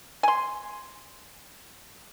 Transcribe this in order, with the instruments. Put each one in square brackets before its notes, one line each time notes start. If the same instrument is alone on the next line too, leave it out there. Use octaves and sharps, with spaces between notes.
[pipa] G#5 C6